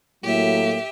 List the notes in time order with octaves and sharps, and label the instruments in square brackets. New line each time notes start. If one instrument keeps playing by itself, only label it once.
[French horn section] A2 F#3 A#3 [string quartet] G4 E5